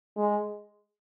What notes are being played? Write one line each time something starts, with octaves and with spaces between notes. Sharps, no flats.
G#3